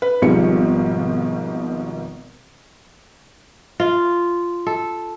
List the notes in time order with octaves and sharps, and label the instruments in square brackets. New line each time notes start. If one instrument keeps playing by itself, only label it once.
[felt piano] B4
G#1 G#2 B2 F3 G3 C#7
[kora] F4
A4